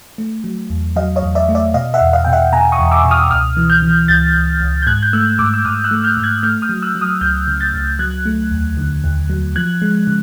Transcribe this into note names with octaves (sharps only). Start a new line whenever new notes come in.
A3
F#3
E2
F#3 D#5 F5
C#5 D#5
E2
D5 E5
A3
D5 E5
B2 D#5 F5
E5 F#5
E2
D#5 F5
B2 G5
E5 F#5
B2 G#5 A#5
C#6 D#6
E2
D6 E6
B2
D#6 F6
C#2 D#6 F6
E3
F6 G6
E3
C#2 G6 A6
C#2
C#2
G6
G#2 F#6 G#6
G6
A3 E6 F#6
G#2 D6 E6
E6
G#2 D#6 F6
E6 F#6
A3
F6 G6
G#2
F#6 G#6
A3 F6 G6
D#6 F6
F#3
E6 F#6
F#3
D#6 F6
C#2 F6 G6
C#3
G6 A6
C#2
F#3 F#6 G#6
A3
D#2
D3
D#2
F#3
F3 F#6 G#6
G#3
C#3